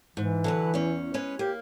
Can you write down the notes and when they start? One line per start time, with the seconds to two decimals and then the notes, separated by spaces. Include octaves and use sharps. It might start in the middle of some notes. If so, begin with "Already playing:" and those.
0.17 G#2 E3
0.44 D3 F#3 B4
0.74 E2 C#4
1.14 G#3 C#4 B4
1.39 A#3 G4